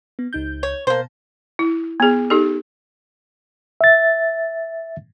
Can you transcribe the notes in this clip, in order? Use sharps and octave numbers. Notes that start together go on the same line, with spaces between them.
B3
C#2 D#4 G6
C#5
B2 A#3 C5 A5
E4
B3 G#4
D#4 G4 A4
E5 A6